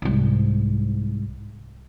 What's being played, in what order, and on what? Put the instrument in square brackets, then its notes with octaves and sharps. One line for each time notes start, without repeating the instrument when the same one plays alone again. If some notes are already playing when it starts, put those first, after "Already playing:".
[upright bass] C2 G#2